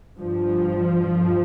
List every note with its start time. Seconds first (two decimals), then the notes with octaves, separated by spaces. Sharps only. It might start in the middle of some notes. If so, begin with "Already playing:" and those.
0.19 G2 F3
1.11 G2